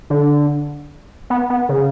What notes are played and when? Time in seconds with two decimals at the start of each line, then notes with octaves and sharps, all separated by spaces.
0.10 D3
1.30 B3
1.50 B3
1.69 C#3